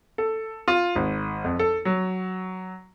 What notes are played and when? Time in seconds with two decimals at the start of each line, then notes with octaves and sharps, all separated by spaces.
0.18 A4
0.68 F4
0.96 G#1
1.44 F2
1.59 A4
1.85 F#3